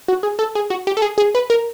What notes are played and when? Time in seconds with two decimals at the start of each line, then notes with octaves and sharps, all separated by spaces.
0.08 F#4
0.23 G#4
0.39 A4
0.55 G#4
0.70 F#4
0.87 G4
0.97 A4
1.02 G#4
1.18 G#4
1.35 B4
1.50 A#4